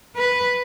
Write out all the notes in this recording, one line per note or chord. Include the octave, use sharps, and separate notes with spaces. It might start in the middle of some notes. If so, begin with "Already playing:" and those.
B4